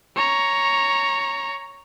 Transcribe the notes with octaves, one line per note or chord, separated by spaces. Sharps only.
C#5 A#5